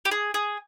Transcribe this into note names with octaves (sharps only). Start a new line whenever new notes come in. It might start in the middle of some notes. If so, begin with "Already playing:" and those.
G4
G#4
G#4